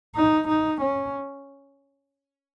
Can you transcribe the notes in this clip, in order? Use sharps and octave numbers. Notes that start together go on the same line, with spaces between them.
D#4
D#4
C#4